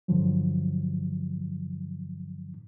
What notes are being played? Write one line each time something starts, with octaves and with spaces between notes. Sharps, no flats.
G2 D3 F3 F#3